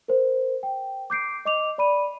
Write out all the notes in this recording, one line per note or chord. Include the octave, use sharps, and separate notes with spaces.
A#4 C5
G5
D6 G6 C7 D7
D#5 D6 F7
D5 B5 D#7